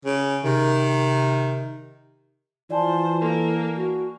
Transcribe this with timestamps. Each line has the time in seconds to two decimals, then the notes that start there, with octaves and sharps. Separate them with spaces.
0.05 C#3
0.44 C3 D#3
2.70 E3 F4 C5 D5 G#5 A5
3.21 A#3 A4 A#4
3.76 F#4